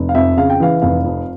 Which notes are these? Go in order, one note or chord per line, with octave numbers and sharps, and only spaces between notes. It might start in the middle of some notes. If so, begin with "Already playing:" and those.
Already playing: F1
F5
F2 E5
C#3 F5
G5
E3 F5
F1 F5
F2